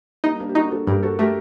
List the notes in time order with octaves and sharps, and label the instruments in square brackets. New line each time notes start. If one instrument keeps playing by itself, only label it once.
[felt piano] G3 A#3 [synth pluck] D#4
[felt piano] A#3 D4
G4
[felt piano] D4 F#4 [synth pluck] D#4
[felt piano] F#4 A4
[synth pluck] G2 [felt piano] G4 A#4
[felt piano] F#4 A4
[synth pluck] A3 [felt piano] G4 A#4